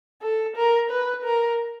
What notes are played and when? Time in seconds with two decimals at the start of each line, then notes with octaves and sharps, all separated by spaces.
0.22 A4
0.56 A#4
0.90 B4
1.24 A#4